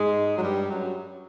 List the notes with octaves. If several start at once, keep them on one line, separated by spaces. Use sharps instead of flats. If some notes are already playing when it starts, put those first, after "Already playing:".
Already playing: G#2 G#3
F#3
G2 G3
F#2 F#3